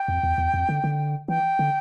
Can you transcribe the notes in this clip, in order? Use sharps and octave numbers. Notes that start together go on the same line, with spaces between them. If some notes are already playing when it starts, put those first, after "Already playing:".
Already playing: G5
F2
E2
E2
F2
D3
D3
E3 G5
D3